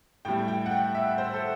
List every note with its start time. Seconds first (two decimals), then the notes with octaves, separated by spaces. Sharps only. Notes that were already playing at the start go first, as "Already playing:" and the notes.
0.25 A2 G3 G5
0.48 G5
0.66 F#5
0.71 G5
0.95 E5
1.18 C5
1.34 A4